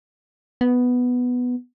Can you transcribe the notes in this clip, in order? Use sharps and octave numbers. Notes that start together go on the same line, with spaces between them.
B3